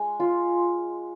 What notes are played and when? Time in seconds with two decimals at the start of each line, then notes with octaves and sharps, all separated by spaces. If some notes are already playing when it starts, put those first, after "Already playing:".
Already playing: G#3
0.20 F4